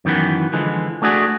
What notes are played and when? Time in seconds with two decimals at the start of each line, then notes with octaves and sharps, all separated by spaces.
0.05 F#2 D#3 E3 B3
0.53 D3 E3 F3 G#3
1.02 A3 D4 F#4 G#4